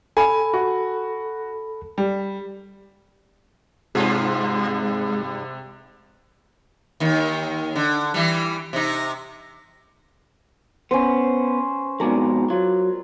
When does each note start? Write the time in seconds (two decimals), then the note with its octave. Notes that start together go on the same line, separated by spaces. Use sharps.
0.17 A4 G#5 B5
0.53 F#4
1.98 G3
3.95 G2 C3 G#3 F4 G#4
7.00 D#2 D#3
7.75 D3
8.14 E3 G3
8.73 C3 D#4
10.91 B3 C#4 C5
12.00 F2 G#2 B2 A#4 D5
12.50 F#3 F4